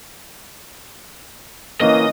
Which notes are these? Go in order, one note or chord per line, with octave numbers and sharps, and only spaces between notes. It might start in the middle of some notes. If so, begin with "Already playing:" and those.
E3 A#3 C#4 D#5